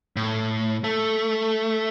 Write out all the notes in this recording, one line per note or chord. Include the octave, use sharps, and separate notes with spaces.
A2
A3